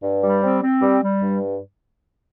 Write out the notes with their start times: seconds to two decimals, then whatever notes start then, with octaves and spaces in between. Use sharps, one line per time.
0.03 G2
0.23 G3
0.43 C4
0.63 C4
0.82 G3
1.03 G3
1.22 G2